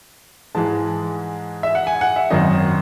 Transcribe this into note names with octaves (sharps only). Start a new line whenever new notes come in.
G#2 E3 G#3 A5
E5
F#5
G#5
F#5
E5
G#1 F#2 D#3 D#5